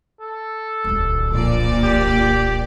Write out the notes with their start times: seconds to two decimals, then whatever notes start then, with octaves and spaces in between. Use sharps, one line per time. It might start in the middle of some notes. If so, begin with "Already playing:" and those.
0.21 A4
0.84 D1 C2
1.30 A#1 A#2 D5
1.84 G4